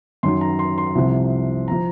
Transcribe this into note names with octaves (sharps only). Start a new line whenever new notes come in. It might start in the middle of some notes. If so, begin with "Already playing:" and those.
F#2 D#3 F#3 C6
A#5
C6
C6
C2 C3 F3
F3 A#5